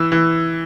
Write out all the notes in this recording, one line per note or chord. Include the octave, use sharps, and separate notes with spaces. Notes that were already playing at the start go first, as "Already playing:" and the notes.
Already playing: E3 E6
E3